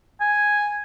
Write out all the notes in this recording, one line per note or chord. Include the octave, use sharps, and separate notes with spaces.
G#5